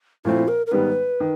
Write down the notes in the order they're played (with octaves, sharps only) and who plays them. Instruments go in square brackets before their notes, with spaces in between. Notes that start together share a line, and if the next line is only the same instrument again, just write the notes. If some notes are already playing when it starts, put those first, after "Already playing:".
[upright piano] A#2 F3 A3 C4 [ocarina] E4
[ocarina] A#4
A#4
[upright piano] G#2 D#3 G3 B3 [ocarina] B4
[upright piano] D#3